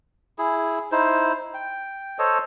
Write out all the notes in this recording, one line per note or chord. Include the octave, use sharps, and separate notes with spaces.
E4 G#4
D#4 E4 C5
G5
A4 C5 C#5 D#5